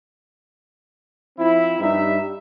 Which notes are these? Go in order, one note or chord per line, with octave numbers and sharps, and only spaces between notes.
F3 C4 E4
G2 G3 D#4 E5